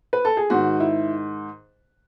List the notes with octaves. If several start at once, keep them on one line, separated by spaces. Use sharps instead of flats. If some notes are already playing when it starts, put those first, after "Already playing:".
B4
A4
G#4
G#2 D#3 F#4
E4